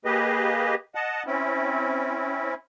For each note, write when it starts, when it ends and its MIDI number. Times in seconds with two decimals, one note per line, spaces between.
0.05 0.75 58
0.05 0.75 67
0.05 0.75 68
0.05 0.75 71
0.05 0.75 75
0.95 1.23 75
0.95 1.23 78
0.95 1.23 81
1.27 2.54 60
1.27 2.54 61
1.27 2.54 64